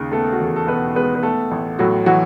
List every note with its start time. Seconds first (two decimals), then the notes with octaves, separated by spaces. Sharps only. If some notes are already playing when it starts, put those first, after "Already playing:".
Already playing: D#2 C#3
0.12 A3 B3 A4
0.33 F#4
0.40 E2 G#4
0.56 A4
0.67 B2 B3 B4
0.95 G#3 B3 B4
1.15 B4
1.23 A3 B3 A4
1.51 A1
1.79 A2 F#3 F#4
2.06 E3 F#3 F#4